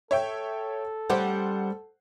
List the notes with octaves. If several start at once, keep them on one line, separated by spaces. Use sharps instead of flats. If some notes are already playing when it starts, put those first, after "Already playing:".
A4 C#5 E5 G5
G3 C#4 G4 C5 F#5